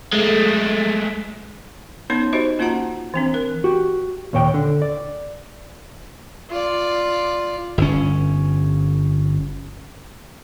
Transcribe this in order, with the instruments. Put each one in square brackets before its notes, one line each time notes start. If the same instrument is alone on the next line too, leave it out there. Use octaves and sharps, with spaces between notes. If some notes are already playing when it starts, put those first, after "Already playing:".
[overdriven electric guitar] G#3 A3
[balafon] B3 C#4 D#4 C#5 C6
D#4 F#4 G4 C5 D#5 E5
A#3 C#4 F4 F#4 F#5 A#5
E3 C4 D4
A#4
[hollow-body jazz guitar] F#4 G4
D#2 A#2 C#5 G5
D3
D5
[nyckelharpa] F4 D5
[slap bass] G1 C#4